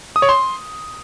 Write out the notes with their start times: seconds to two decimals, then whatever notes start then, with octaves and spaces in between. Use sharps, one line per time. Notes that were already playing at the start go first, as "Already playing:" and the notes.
0.16 D#6
0.22 C#5
0.29 C6